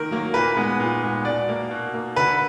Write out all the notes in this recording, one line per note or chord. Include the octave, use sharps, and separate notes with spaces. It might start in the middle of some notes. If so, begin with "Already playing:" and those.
Already playing: D#3 A#3 A#4
F#3 A#3
A#2 B4
G#3 B3
A#2
G#3 B3
B2 D5
A#3
B2
A#3
D3 B4